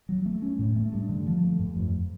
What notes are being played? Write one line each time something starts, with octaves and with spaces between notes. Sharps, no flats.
F#3
A3
C#4
A2
A3
G2
D3
F3
A3
G2
F2